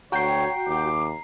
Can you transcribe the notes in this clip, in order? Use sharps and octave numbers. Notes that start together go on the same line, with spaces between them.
D2 F#4 C#5 G5 A#5 C7
D#2 D6